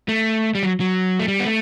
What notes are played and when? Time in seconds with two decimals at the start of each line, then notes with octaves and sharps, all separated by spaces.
0.09 A3
0.55 G3
0.63 F#3
0.80 F#3
1.19 A3
1.28 G3
1.40 B3
1.46 A3